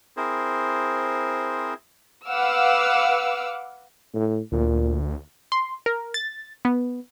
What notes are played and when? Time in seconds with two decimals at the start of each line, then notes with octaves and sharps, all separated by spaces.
0.17 C4 E4 G#4 A#4 C5
2.27 B4 F5 F#5 D6 E6 F6
4.14 A2
4.52 D2 A#2
5.52 C6
5.86 A#4
6.14 A6
6.65 B3